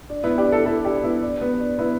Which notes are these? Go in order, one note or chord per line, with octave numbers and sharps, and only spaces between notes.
D4
B3 E4
D4 G4
E4 A4
E4 A4
D4 G4
B3 E4
D4
B3
D4
B3 E4